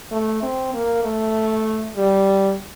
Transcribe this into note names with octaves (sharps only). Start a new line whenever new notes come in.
A3
C4
A#3
A3
G3